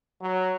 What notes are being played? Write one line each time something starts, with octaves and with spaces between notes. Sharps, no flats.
F#3